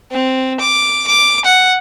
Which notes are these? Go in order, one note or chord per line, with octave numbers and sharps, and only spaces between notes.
C4
D6
D6
F#5